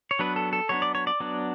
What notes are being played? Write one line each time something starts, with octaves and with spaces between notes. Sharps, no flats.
C#5
F#3 B3 D4 B4
A4
A4
F#3 B3 D4 C#5
D5
C#5
D5
F#3 B3 D4